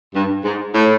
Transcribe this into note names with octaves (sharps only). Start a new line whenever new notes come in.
G2
G#2
A2